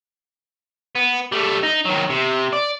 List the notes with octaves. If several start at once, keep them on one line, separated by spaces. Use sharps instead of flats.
B3
G3 A3
D#4
D#3 F#3
C3
D5